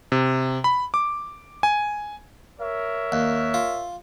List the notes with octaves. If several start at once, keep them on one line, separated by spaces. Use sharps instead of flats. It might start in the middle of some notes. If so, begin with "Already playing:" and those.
C3
B5
D6
G#5
A#4 C#5 E5
D#2
F4